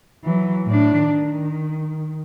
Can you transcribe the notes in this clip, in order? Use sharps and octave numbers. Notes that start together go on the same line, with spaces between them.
E3 F#3
A2 D4
D#3